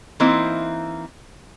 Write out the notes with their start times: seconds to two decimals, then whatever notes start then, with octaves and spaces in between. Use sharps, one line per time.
0.20 E3 A#3 C4 D#4 E4 C5